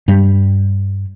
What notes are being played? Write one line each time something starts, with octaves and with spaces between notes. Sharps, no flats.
G2 G3